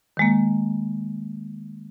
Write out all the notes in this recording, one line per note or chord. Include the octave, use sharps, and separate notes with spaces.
D#3 G#3 A#3